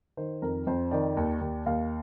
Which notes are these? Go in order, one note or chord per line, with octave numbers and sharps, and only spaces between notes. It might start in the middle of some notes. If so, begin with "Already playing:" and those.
D#3 C5
F2 A#4
F2 C5
D#3 D5
D#2
D#2
D#2 F5